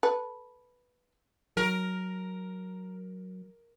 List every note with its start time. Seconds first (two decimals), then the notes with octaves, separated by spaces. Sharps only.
0.03 A4 B4
1.57 F#3 A#4